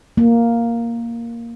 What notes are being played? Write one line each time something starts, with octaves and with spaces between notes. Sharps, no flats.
A#3